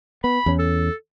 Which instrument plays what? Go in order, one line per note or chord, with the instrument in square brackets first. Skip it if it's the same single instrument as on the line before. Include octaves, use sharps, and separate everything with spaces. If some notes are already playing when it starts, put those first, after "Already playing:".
[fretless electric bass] B3 [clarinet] B5
[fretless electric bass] E2 C#4
[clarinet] A4